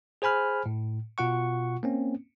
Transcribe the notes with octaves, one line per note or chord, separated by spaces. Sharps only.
G#4 C5 G#5 B5 F6
A2
B2 F4 F#5 C#6
A#3 C4 C#4